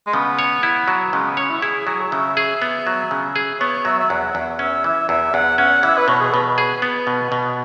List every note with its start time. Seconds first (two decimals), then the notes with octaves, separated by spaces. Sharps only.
0.07 G#3
0.13 C#3 B3
0.39 C#5
0.63 E4
0.88 F#3
1.13 C#3 G#3
1.25 B3
1.37 C#4 C#5
1.49 E4
1.62 E4 G#4
1.87 F#3 G#4
2.01 C#5
2.12 C#3 E5
2.37 G#4
2.62 B3
2.87 F#3
3.11 C#3
3.36 G#4
3.60 B3 C#5
3.85 F#3 E5
4.00 E5
4.10 E2 F#5
4.35 E2
4.59 C#4 E5
4.84 E3 E5
5.09 E2 E5
5.34 E2 F#5
5.58 C#4 F#5
5.83 E3 E5
5.97 B4
6.08 B2 C#5
6.21 G#4
6.33 B2 B4
6.46 B4
6.58 G#4
6.82 B3
7.07 B2
7.32 B2